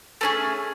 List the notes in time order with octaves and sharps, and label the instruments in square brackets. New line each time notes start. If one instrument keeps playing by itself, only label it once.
[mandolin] A3 C#4 G#4